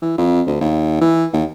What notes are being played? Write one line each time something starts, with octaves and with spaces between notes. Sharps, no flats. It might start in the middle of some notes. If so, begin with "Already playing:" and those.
E3
F2
D2
D#2
E3
D#2